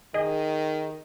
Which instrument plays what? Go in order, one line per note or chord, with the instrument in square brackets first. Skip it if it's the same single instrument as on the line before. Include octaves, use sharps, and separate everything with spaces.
[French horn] D#3 [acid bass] G#4 [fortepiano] D#5